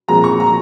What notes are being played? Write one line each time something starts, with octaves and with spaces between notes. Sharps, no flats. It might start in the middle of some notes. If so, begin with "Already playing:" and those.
A#2 F3 G#3 C4 A#5
C#6
A#5